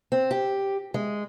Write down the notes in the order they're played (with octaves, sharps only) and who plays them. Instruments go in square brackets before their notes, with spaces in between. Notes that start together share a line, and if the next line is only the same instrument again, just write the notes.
[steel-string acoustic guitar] C4
G4
G#3